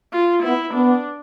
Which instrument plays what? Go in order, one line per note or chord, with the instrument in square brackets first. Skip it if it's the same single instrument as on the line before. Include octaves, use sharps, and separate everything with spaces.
[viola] F4
[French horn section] B3 [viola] E4
[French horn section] B3 [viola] D4